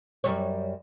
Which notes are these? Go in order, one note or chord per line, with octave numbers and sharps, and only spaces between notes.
F#2 G3 C#5